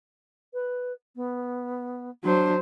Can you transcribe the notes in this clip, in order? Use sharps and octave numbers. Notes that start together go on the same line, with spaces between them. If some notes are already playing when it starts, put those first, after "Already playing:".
B4
B3
F#3 D4 C5